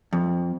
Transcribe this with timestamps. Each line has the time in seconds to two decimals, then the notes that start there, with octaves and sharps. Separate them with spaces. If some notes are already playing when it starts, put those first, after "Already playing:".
0.13 F2